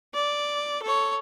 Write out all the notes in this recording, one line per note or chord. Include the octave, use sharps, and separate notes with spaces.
D5
A4 C#5